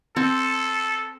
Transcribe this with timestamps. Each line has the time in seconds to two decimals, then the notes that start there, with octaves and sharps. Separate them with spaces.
0.16 C4 A4